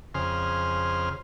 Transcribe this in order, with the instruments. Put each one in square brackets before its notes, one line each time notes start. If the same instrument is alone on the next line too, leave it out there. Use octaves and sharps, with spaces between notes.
[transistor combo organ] F2 C#3 G#4 C5 C6 F6